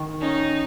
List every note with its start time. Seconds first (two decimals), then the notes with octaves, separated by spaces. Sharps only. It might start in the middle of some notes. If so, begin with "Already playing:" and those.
Already playing: D#3
0.21 C#4 D#4